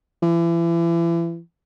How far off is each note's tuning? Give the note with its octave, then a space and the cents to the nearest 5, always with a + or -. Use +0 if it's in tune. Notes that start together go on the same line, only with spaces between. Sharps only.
E3 +35